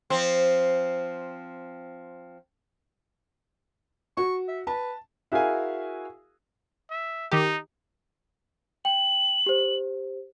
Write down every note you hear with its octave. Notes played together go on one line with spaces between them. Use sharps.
F3 C4
F#4 C#6
E5
B4 A5
E4 F#4 G#4 A#4 F5 G#5
E5
D#3 D#4 G4
G5 F#7
G4 C5